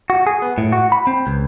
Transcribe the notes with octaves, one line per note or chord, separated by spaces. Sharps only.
F#4
G#4
B3
A2
F#4
B5
C4
C#2